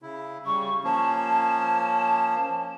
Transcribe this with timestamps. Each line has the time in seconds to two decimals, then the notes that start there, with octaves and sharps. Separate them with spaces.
0.02 C#3 E4
0.46 C#3 G3 C#6
0.84 F3 A#3 C#4 A5